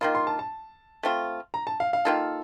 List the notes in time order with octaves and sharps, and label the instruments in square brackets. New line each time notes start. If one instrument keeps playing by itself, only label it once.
[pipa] D#3 A#3 F4 [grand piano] C6
[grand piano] C6
A5
A5
[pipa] A3 C4 F4
[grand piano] A#5
A5
F5
F5
[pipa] D#3 A#3 F4 A4